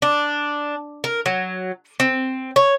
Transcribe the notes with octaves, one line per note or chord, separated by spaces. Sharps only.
D4
A#4
F#3
C4
C#5